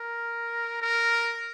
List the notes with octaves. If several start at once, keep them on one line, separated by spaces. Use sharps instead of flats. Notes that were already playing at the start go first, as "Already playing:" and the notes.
Already playing: A#4
A#4